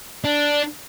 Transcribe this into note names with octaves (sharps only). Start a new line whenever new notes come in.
D4